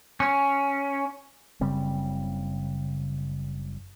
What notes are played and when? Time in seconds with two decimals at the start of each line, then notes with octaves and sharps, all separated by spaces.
0.20 C#4
1.61 F#1 C#3 G3 C4